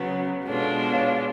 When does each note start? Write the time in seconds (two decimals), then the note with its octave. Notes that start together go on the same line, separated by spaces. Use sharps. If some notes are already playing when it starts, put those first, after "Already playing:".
Already playing: C#3 F#3 B3 G#4 B4
0.47 B2 G#3 D4 F4 A4 C#5
0.93 C#5 F5